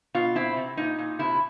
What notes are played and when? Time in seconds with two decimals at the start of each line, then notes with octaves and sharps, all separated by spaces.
0.14 B2 F4
0.35 C4 E4
0.56 C3
0.77 A#2 D#4
0.98 A#2
1.19 C3 E4